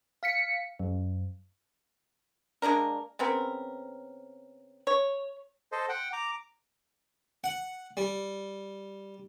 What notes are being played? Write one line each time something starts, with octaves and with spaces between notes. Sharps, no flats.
F5 B6 C#7
F#2
G#3 A#3 D4 A#4
C#3 B3 C4 A#4
C#5
A4 C5 D#5
F#5 G5
A#5 D6
F#5
G3